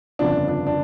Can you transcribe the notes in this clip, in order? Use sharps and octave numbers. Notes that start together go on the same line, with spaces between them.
G1 F2 C#3 F3 D4
D4
D4